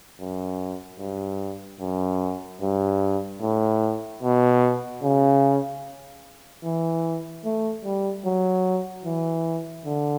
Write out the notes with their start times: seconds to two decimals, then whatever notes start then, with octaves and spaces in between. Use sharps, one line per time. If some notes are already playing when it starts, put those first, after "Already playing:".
0.20 F#2
0.99 G2
1.80 F#2
2.62 G2
3.41 A2
4.23 B2
5.03 C#3
6.64 E3
7.45 A3
7.84 G3
8.25 F#3
9.05 E3
9.85 D3